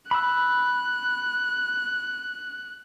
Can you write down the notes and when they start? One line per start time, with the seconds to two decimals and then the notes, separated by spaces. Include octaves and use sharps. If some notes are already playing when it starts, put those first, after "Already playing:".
0.11 B5 E6 F#6